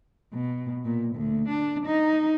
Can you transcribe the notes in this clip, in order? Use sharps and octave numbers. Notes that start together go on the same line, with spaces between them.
B2
A#2
D2
D4
D#4